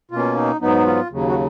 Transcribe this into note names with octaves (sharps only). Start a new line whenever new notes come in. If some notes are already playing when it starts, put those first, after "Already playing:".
B2 A#3 C#4 F4
D#4
G#2 F#3 B3 D#4
F4
D#2 C#3 F#3
F#4